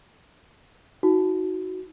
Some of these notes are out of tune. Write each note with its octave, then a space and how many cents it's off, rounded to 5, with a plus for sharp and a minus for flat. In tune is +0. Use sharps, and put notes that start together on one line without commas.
D#4 +35 F#4 +0